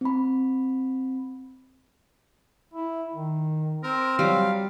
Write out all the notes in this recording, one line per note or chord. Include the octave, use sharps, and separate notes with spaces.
C4 B5
E4
D#3
C4 A#4
F#3 G3 F5